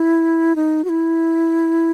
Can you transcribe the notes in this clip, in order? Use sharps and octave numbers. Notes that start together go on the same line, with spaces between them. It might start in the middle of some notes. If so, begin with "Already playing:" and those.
Already playing: E4
D#4
F#4
E4